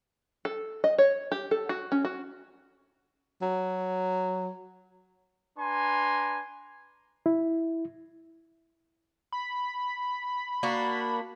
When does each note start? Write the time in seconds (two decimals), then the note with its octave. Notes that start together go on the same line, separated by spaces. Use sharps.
0.45 A4
0.84 D#5
0.98 C#5
1.32 G4
1.51 A4
1.69 F#4
1.92 C#4
2.05 F#4
3.42 F#3
5.58 D4 B4 G#5 A#5 C6
7.26 E4
9.32 B5
10.63 A#3 D4 F#4